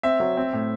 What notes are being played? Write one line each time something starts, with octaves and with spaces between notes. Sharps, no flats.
C4 E5
F#3
C4
A2